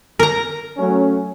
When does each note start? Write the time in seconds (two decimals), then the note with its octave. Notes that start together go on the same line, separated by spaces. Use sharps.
0.19 A#4 A#5
0.77 F#3 A3 C#4